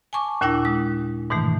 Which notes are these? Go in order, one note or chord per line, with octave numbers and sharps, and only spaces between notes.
G#5 A5 C#6 D6
D#2 A#2 D4 E4 G5 A#6
G#3 D#6
G#2 B2 D#3 E3 A3